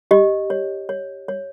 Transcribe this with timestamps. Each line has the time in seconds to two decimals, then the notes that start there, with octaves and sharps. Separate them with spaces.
0.11 G4 D#5
0.50 C#5
0.89 C#5
1.28 C#5